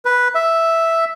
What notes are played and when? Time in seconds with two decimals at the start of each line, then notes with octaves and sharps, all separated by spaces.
0.05 B4
0.35 E5